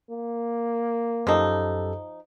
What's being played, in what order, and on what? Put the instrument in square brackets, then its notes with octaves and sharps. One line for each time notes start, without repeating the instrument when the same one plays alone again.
[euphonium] A#3
[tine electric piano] F#2 G4 A4 [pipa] F3 D#4